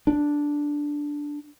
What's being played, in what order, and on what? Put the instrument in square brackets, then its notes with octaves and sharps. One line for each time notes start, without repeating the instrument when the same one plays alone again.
[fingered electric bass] D4